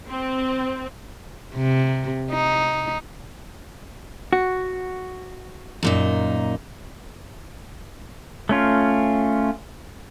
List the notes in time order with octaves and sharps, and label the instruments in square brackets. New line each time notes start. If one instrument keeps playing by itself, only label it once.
[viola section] C4
[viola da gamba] C3
D#4
[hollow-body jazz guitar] F#4
[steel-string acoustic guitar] F#2 A#2 D#4
[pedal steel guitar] A3 C#4 F4